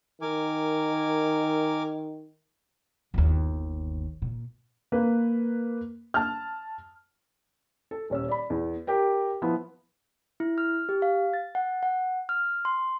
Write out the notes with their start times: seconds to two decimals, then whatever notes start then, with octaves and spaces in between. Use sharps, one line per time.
0.22 D#3 A#4 G#5 D6
3.14 G1 D#2
4.22 A#2
4.92 A#3 B4
6.14 A5 F6
7.91 A4
8.10 D#1 C#4 E6
8.29 D5 B5
8.50 E2
8.87 G4 A#4 G5
9.42 F3 B3 E4
10.40 E4
10.58 F6
10.89 G4
11.02 F5
11.33 A6
11.55 F#5
11.83 F#5
12.29 F6
12.65 C6